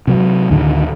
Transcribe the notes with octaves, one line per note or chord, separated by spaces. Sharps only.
C3 F#3
D2 A2 D3 D#3